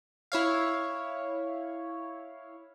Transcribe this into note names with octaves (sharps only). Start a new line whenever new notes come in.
E4 C#5 F5